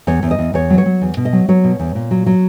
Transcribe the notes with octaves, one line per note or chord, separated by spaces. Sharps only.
E2 C#5
E2
D#5
E2
E2 C#5
F#3
C#5
F#3
E2
B2
D#5
F#3
F#3 C#5
B2
E2
A#2
F#3
F#3